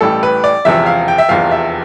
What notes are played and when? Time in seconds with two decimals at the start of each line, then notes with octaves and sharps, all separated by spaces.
0.01 A1 A2 G3 A4
0.23 B4
0.44 D5
0.65 E1 E2 C3 F3 E5
0.86 F5
1.08 G5
1.18 E5
1.29 F1 E2 C3 F3 F5
1.51 E5